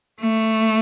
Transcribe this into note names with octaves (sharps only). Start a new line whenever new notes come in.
A3